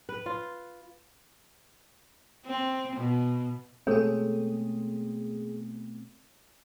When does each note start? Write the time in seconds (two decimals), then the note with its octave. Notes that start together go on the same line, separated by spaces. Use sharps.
0.09 B4
0.26 F4
2.46 C4
2.96 B2
3.87 B2 G#3 A3 C4 G#4 A4 C#5